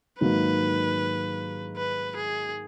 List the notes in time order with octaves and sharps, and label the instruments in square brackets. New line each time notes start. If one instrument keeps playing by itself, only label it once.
[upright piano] G#2 D#3 F#3 A#3 [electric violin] B4
[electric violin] B4
G#4